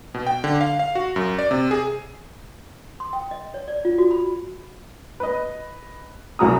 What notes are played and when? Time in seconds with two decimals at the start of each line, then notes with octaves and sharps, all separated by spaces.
0.14 B2
0.27 G5
0.44 D3
0.61 F5
0.79 F5
0.95 F#4
1.16 F#2
1.39 D5
1.51 C3
1.71 G#4
3.00 C6
3.13 G5
3.31 D#5
3.54 C#5
3.68 D5
3.85 F4
3.98 F#4
4.11 B5
5.20 B4 D#5
6.39 C2 F#2 F#4 A#5 D#6